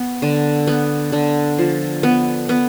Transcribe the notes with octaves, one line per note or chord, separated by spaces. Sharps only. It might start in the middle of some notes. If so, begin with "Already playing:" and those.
Already playing: B3
D3
B3
D3
F3
B3
B3